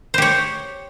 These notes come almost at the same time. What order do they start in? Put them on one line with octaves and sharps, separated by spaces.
C5 G4 C#5